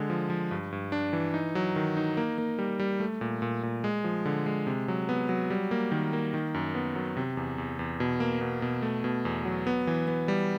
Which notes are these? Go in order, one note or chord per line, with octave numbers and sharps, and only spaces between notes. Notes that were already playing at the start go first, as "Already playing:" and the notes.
Already playing: D3 G#3
F3
F3
G2
G2
D4
E3
D#4
F#3
D#3
D#4
A#3
A#3
G3
G3
A3
A#2
A#2
A#2
G#3
F3
D3
G#3
C3
F#3
B3
F#3
G3
A#3
D#3
A#3
D#3
F#2
B3
F#3
C3
E2
E2
E2
B2
A#3
B2
B2
A3
B2
E2
F#3
B3
E3
B3
G3